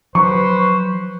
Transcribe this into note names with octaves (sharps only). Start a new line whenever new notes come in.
F3 F#3 B4 C5 C#6